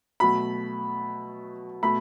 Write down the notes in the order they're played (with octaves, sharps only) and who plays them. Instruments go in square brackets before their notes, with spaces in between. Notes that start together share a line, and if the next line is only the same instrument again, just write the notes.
[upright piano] B2 F#3 A3 B5
B2 A3 B5